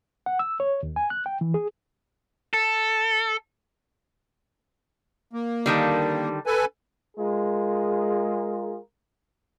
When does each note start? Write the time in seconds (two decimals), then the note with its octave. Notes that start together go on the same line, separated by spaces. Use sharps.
0.26 F#5
0.39 E6
0.60 C#5
0.83 D#2
0.96 G#5
1.10 F#6
1.26 G5
1.41 E3
1.54 G#4
2.54 A4
5.33 A#3
5.66 D3 D#3 G3
6.46 A4 B4 G#5
7.18 G#3 F4 G#4 A#4